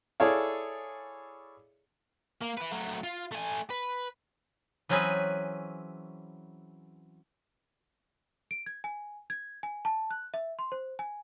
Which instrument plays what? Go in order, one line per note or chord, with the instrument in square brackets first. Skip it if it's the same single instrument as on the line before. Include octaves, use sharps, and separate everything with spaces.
[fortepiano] E4 G#4 A4 C#5 D5 F5
[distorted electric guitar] A#3
E4 B4
F#3 A3
F4
A3 G#5
B4
[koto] E3 F#3 C4 C#4 G#4 B4
[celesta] D7
G#6
G#5
G#6
G#5
A5
F#6
E5
C6
C5
G#5